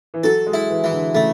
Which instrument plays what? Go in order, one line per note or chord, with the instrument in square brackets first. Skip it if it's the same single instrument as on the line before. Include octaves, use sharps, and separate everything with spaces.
[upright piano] E3
[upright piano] F#3 [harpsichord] A4
[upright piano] G#3
[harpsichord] E4
[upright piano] E3
[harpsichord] E3
[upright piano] D3
[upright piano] C#3 [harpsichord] A3